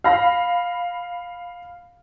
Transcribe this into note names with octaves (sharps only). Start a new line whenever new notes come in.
F5 B5 A#6